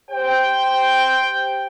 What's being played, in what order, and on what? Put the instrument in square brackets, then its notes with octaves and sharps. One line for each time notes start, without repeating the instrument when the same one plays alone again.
[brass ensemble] G4 C5 G5